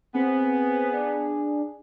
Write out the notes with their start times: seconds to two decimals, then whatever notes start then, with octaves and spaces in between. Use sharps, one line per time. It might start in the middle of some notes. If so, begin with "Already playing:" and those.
0.15 B3 C4 G#4
0.93 D4